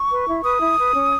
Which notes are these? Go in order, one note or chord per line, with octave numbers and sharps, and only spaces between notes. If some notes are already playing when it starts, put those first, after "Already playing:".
Already playing: C#6
B4
E4
B4 D#6
E4
B4
C#4